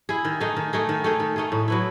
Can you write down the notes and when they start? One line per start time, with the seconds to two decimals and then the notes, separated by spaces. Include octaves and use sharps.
0.09 E4 G#4
0.25 D#3
0.41 A3 D#4 G#4
0.57 D#3
0.73 A3 D#4 G#4
0.89 D#3
1.04 A3 D#4 G#4
1.20 D#3
1.36 A3 D#4 G#4
1.52 A2
1.68 F#3 B3 E4